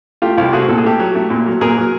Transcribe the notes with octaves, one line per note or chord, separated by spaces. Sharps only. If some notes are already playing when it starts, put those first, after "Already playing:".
A3 F4 G4
C2 F4 G4
A3 F#4 G#4
A#2 A4
G#4
A3 G4 A4
F#3
A3
A#2
F#3
A#2 G#4 A#4
F#3